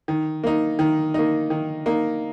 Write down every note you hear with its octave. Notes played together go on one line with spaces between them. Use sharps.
D#3
A#3 D#4
D#3
A#3 D#4
D#3
A#3 D#4